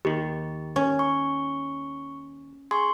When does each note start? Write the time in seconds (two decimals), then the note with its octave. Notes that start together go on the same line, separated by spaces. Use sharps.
0.05 D#2 D#3 G4
0.76 C#4
0.99 C#6
2.71 G#4 C6 C#6